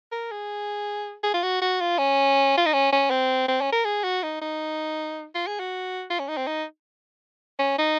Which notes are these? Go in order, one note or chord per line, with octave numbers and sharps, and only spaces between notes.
A#4
G#4
G#4
F4
F#4
F#4
F4
C#4
F4
D#4
C#4
C#4
C4
C4
C#4
A#4
G#4
F#4
D#4
D#4
F4
G#4
F#4
F4
C#4
D#4
C4
D#4
C#4
D#4